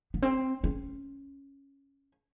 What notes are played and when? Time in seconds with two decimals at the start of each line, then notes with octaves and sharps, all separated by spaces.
0.14 B3
0.22 C4
0.64 C#4